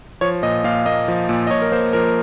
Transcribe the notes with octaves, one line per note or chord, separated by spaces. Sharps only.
F3 C#5
A#2 D#5
A#2 F5
A#3 D#5
F3
A#2
D#5
A#2 C#5
A#4
A#3 C5
F3 A#4